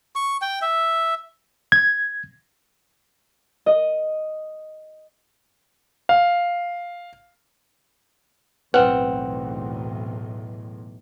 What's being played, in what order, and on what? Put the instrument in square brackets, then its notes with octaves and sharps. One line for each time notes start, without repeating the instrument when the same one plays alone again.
[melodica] C#6
G5
E5
[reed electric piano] G#6
[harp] D#5
[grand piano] F5
[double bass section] B1 E2 A2 [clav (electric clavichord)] C4 F#5 [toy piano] B4